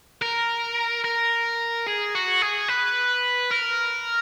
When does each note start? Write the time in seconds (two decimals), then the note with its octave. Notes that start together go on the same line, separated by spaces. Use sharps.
0.22 A#4
1.04 A#4
1.87 G#4
2.15 F#4
2.42 G#4
2.68 B4
3.51 A#4